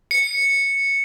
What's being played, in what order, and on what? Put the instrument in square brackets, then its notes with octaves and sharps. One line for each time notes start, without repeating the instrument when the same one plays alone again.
[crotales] C#7